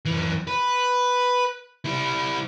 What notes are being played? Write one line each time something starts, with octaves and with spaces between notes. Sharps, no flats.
F#2 E3
B4
G3 E4